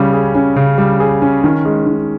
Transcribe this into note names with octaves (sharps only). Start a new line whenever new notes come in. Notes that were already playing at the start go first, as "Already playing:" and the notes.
Already playing: C#3 G3 C#4
G#4
C#4
C#3
G3
G#4
C#4
D#3
G#3
D#3